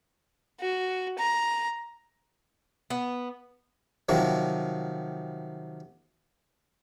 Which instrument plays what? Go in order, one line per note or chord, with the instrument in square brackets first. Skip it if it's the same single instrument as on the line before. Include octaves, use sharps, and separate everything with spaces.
[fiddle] F#4
A#5
[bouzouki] B3
[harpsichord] C3 D#3 F3 F#3